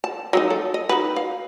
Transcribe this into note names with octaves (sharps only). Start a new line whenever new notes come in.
A5
F#3 B3 D#4
A4
D#5
D#4 F#4 B4
F5